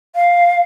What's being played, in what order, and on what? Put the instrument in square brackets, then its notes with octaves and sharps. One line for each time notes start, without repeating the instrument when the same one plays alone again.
[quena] F5